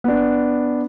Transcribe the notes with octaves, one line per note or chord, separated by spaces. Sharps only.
B3 D4